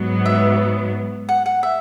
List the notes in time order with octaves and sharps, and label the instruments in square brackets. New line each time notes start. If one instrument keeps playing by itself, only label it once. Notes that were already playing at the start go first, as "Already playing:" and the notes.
Already playing: [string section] G#2 F#3 B3
[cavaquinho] E5
F#5
F#5
E5